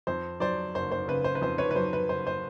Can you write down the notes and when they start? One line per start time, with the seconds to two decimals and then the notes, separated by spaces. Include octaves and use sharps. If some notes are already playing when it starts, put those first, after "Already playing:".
0.07 F2 C5
0.40 F#3 C5 D5
0.75 F#1 C5
0.91 C5
1.08 C#3 B4
1.24 C5
1.35 B4
1.41 F2 C5
1.58 B4 C#5
1.71 B4
1.76 F#3 C5
1.93 B4
2.09 F#1 C5
2.27 C5